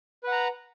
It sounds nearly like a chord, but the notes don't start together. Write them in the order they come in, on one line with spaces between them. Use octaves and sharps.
B4 F#5 A#5